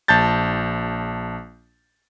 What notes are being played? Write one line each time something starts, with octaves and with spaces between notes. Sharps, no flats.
A#1 A5 G6 A6